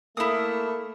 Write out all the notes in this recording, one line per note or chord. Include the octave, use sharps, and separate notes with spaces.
A3 A#3 E4 D#6